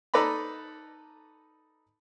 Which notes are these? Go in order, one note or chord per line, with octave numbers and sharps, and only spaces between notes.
D#4 A4 B4 D5 A#5 B5